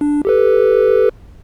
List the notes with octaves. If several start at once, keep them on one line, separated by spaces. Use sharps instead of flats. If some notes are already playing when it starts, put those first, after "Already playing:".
D4
G4 A4 B4